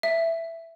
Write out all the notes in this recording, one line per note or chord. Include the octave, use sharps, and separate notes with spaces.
E5